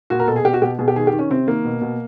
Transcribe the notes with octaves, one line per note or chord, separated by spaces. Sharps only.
A#2 F#4
A#4
B2 A4
G#4
B2 G4
F#4
B2 G4
B2 G#4
G4
D#3 G#4
G4
D#3
C#4
C3 C4
D#3 A#3
B2
B2